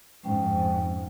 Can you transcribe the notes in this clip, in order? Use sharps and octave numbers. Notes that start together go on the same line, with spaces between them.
F2 G#2 G#3 C#4 G5